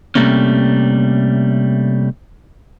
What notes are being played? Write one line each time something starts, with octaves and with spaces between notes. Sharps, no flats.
C3 F#3 G3 A3 A#3 C#4